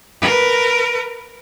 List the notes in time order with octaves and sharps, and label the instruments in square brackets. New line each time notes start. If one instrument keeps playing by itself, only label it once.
[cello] A#4 B4